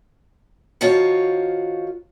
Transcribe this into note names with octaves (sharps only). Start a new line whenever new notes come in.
D#3 F3 F4 F#4 C#5